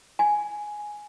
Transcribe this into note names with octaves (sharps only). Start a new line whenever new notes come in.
G#5